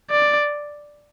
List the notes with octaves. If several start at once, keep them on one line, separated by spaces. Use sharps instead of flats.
D5